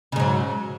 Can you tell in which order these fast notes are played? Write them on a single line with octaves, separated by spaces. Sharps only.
C#3 G#2 F#3